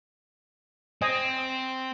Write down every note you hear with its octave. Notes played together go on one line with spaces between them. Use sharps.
C4 D#5 G#5